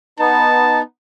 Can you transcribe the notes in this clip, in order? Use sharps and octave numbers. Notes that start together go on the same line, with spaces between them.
B3 D#4 A5